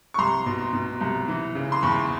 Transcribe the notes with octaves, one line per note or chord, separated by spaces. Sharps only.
C#6
C2 A#5 C6
B2
B2
C2
E3
C#3
C6
E2 B5 C#6